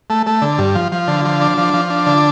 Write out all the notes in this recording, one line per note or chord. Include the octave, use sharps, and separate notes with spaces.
A3
A3
D3
G2
F3
F3
D3
F3
D4
F3
F3
D4
D3